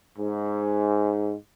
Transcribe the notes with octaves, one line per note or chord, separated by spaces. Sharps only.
G#2